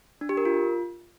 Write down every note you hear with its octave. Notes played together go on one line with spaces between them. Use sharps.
D4
G4
A#4
F4